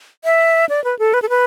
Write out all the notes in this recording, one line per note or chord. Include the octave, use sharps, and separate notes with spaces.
E5
D5
B4
A4
B4
A4
B4